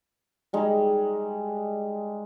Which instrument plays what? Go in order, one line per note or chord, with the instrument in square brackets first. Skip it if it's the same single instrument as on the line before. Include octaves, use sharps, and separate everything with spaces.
[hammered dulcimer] G3 G#3 D#4